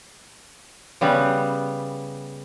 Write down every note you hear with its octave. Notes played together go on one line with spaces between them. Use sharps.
C#3 G3 B3